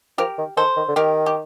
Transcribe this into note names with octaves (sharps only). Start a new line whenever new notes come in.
F3 G4 A#4
D#3
D#3 A4 C5
D#3
D3
D#3 G4 A#4
G4